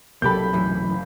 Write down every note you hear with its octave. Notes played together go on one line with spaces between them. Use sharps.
B1 C3 F#3 A#3 G4 A4 B5 G6
F#2 A2 E3
F#1